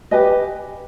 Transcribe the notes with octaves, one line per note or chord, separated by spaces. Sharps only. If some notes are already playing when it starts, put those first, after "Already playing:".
G4 B4 D#5 G#5